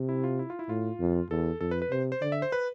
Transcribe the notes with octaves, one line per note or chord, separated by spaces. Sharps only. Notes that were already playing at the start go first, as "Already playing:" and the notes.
Already playing: C3
E4
F4
E4
F4
E4
A2 F4
F2
E2 A4
F2 A4
B4
B4
C3 C5
C5
D3 D5
E5
C5
B4